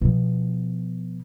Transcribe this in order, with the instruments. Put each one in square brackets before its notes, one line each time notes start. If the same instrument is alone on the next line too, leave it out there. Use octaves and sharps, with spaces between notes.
[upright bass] B2 F3